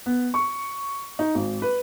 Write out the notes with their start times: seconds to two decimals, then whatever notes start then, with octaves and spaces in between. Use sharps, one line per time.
0.06 B3
0.34 C#6
1.19 D#4
1.35 G#1
1.62 B4